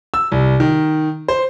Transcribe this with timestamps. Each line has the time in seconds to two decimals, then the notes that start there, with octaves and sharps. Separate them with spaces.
0.14 E6
0.32 C2
0.60 D#3
1.28 C5